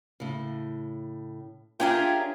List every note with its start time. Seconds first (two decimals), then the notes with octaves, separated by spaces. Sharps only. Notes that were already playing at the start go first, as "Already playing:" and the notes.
0.20 A2 C#3
1.80 D4 F4 G4 G#4 A#4 C#5 E5